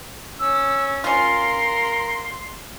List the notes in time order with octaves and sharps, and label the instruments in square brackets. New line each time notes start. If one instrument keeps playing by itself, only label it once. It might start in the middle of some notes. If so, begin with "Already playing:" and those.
[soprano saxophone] C#4 [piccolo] E6
[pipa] C#4 F4 [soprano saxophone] A#4 [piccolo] C6